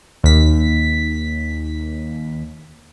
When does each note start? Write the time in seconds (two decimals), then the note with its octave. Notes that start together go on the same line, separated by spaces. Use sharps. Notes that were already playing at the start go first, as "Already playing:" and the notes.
0.24 D#2 B6